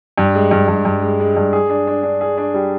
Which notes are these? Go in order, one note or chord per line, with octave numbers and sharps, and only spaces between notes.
G2
G#3
G2
G2
G2
G#3
G#3
G2
G#4
D4
D4
D4
G#4
D4
G3